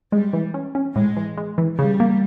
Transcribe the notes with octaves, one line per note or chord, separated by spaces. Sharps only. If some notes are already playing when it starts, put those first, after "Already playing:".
G3 G#3
E3
C#4
C#4
A2 G#3
E3
G#3
E3
C#3 G3
A#3